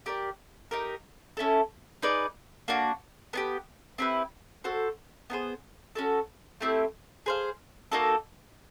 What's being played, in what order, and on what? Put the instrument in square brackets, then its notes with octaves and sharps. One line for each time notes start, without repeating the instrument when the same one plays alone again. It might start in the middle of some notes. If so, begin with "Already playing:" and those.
[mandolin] G4 A#4 D5
D#4 G4 A#4
C#4 E4 A4
D#4 G#4 B4 D5
A#3 D4 F#4
B3 D4 G4
C4 E4 G4 B4
F#4 A4 C5
B3 D#4 G#4 C5
C#4 F#4 A4
A3 C4 E4 G4
G#4 C5 F5
A#3 D#4 F#4 A4